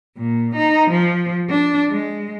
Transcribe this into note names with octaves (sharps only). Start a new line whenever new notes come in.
A#2
D#4
F3
D4
G#3